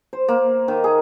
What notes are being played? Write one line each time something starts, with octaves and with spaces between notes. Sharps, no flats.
C5
A#3
D#3
G#4